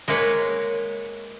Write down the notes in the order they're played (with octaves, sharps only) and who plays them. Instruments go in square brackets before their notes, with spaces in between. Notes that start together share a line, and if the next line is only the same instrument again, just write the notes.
[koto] G#3 A#3 B4 C#5